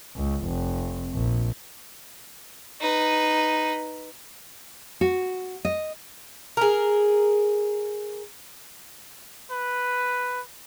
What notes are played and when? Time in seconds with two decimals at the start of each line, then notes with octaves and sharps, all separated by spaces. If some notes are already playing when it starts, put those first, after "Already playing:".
0.16 C#2
0.45 F1
1.14 A#1
2.81 D#4 B4
5.01 F#4
5.65 D#5
6.57 G#4 A#4
9.51 B4